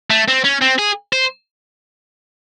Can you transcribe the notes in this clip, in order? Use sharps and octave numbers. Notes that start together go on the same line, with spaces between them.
A3
C4
C#4
C4
G#4
C5